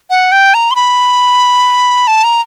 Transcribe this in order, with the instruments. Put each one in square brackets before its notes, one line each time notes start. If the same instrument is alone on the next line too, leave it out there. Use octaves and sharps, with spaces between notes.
[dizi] F#5
G5
A#5
C6
B5
A5
A#5